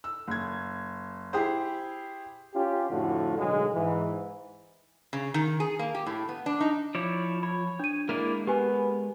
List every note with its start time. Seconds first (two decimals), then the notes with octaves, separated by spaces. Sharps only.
0.04 E6
0.27 F#1 G#6
1.33 E4 G4 G#4 C5
2.55 C#4 F4 G4
2.91 F2 A2 D3 F4 F#4
3.38 B1 D3 F#3 G#3
3.74 G#2 E3
5.13 C#3
5.34 D#3
5.60 G#4
5.79 A#3
5.95 G4
6.06 A2
6.29 B3
6.46 D4
6.60 D#4
6.95 F3 E4 C#5 D5
7.43 C#5 B5
7.79 D4 D#7
8.09 G#3 A#3 E4 A#4 D5
8.47 B3 G4 B4 G#5